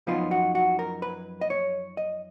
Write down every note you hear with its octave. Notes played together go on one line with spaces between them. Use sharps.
F#2 F3 B3 D#4 F4
F#4
F#4
A#4
B4
D#5
C#5
D#5